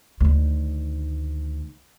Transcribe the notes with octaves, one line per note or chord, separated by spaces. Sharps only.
D2 D#3